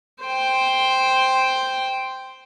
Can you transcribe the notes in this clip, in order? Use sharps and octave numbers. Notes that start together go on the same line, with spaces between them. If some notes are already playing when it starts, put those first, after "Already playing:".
C5 G5